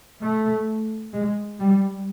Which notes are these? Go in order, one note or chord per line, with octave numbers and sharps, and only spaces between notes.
A3
G#3
G3